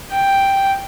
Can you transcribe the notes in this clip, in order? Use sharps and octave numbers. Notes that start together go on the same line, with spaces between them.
G5